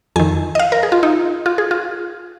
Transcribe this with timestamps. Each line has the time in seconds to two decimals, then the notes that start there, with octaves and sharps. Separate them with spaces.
0.16 F2 D#3 G#5
0.55 D#5
0.59 F5
0.72 A#4
0.83 G#4
0.92 F4
1.03 D#4
1.46 F4
1.58 G#4
1.71 F4